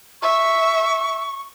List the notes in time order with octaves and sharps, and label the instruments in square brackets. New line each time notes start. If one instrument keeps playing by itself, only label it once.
[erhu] E5 [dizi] C#6